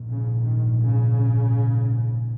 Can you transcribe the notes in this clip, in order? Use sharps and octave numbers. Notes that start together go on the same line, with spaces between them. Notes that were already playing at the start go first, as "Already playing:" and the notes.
Already playing: A#1 G#2
C#3
D#3
C#3